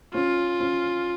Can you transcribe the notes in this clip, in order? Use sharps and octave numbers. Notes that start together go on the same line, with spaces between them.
C#4 F4
C#4